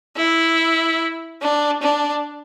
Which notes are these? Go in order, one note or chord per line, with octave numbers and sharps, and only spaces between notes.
E4
D4
D4